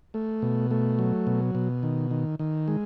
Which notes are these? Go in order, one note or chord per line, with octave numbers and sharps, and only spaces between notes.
A3
B2
A3
F#3
B2
B2
D#3
D#3
D#3
G#3